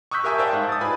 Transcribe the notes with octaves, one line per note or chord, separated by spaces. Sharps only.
C#6 D#6 E6 F#6 G6 B6
G4 A#4 E5 G#5 A5 C#6
C5 D5 E5 F5 G5 A5
G#2
D#6 A6
D#4 F4 B4 G#5 B5